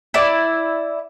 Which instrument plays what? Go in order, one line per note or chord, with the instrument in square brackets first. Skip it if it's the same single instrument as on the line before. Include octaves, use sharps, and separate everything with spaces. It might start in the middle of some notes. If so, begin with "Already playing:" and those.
[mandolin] E4 D5